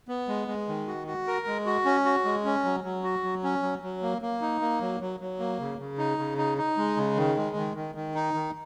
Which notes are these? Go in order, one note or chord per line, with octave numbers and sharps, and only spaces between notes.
B3
G#3
G#3
D#3
F#4
F#4
A#4
G#3
F#4
C#4
F#4
G#3
C#4
F#3
F#3
F#4
F#3
C#4
F#3
F#3
A#3
A#3
D#4
A#3
F#3
F#3
F#3
A#3
C#3
C#3
D#4
C#3
D#4
D#4
G#3
C#3
D#3
G#3
D#3
D#3
D#3
D#4
D#3